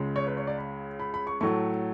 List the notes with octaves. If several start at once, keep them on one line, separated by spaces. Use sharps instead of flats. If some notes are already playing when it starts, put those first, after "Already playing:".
Already playing: C#2 C#3 G#3
C#5
B4
C#5
D5
B5
B5
B5
C#6
A2 F#3 A3 C#6